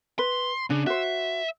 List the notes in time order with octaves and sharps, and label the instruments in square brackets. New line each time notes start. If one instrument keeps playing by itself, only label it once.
[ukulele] B4 [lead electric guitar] C6
[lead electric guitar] C#3 [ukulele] D4
[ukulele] F#4 C5 [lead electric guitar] E5